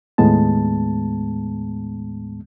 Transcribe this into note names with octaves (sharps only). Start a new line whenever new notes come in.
D#2 A2 G#3 B3 A5